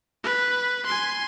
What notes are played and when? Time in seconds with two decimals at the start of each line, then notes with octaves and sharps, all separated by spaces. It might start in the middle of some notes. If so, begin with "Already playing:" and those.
0.24 B4
0.86 G#5 C6